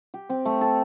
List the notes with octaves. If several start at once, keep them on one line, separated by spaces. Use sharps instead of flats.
G4
C4
A3
A4